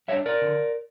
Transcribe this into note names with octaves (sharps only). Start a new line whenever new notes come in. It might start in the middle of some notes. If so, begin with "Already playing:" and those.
G3 D4 C#5 E5
A#4 D5
D3